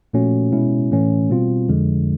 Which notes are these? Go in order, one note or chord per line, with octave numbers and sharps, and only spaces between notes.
A#2 F3 A3 C#4 F#4
B2 G#3 C#4 E4
A2 E3 A3 C#4
B2 G3 C4 F4
F2 D3 F3 G#3